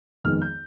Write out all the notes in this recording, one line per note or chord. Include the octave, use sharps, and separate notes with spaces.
F2 D#3 G#3 B3 D#4 F6
G6